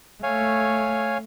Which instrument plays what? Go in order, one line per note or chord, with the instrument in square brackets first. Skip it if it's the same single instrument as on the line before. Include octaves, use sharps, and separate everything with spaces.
[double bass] A3 [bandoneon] C#5 F5 G#5